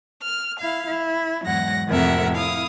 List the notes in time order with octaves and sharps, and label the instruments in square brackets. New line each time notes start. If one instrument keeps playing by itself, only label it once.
[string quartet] F6
E4 F5
E4
E2 G#2 F#3 F#5 A#6
F2 A2 C3 A#4 E5 F#5
E4 F5 D#6